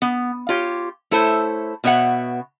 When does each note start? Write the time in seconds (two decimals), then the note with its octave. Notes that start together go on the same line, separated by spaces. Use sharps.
0.02 B3
0.49 F4 G4 C#5
1.11 A3 E4 A4 C5 C#5
1.84 B2 B3 C#5 E5 F#5